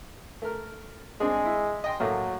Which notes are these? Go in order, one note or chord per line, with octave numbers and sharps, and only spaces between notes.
A3 A#4
G#3 C4 D4 G#4
E4
D#5 G5 C6
A2 F#3 A3 A#3